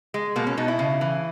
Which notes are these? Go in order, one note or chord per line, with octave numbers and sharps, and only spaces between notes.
G#3
B2 A#3
C#4
B2 D#4
E4
C#3
E3